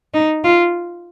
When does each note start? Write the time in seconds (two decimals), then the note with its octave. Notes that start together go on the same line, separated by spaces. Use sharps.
0.14 D#4
0.44 F4